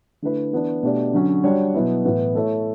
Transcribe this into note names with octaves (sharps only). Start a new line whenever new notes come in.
D3 A3 E4 B4
E3 B3 D4
B2 A3 D4 G4 D5
D3 F#3 C#4
G3 D4 F#4 C#5
B2 F#3 B3 E4
A2 E3 B3
A3 E4 A4 C#5